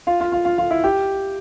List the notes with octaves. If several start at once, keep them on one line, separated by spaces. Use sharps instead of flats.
F4 F5
F4 F5
F4 F5
F4 F5
F4 F5
E4 E5
G4 G5